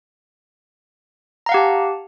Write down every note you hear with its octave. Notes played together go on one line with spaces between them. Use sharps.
G4 F5 F#5 A5 A#5